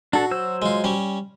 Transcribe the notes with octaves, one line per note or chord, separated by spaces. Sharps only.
D4 F#4 A4
F#3 C5 E6
G#3 F4
G3 C#4